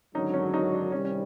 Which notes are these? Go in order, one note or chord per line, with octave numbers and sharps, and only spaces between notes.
G#1 F#2 D3 F#3 C#4 D#4
C#4
C#4 D#4
D4
C2 C3 D#3 G3 C#4
C#4